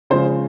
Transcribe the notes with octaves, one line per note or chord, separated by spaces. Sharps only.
C#3 F3 G#3 C5